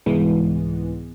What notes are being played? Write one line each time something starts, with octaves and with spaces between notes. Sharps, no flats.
C2 G#2 E3 G#3 B3